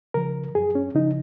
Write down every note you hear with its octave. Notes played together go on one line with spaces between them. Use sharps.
C#3 F3 A#4
F#2 G#4
C#4
C#3 F3 D#4